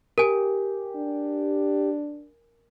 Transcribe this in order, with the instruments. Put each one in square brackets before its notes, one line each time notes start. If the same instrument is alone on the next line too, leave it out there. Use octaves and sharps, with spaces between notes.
[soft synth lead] G4 [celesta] A#4 G#5
[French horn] D4